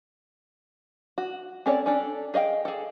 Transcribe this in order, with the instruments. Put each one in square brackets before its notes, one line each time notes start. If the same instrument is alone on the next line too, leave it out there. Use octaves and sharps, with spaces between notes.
[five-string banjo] F#4
C4 C#4 A4 C#5 D5
C#4 D4 A4
G#4 D#5 F5 G5
G#4 A4